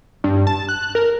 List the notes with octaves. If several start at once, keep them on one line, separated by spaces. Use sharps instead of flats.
G2
A5
F#6
A#4